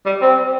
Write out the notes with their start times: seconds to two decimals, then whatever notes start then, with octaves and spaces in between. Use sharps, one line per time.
0.06 G3
0.21 C4